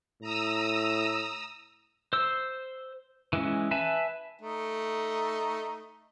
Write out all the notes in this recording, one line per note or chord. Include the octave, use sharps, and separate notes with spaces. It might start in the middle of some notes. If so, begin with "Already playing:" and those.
A2 A#5 D#6 E6
C5 E6
E3 G#3 C#4
B4 E5 G#5 A5
A3 D#4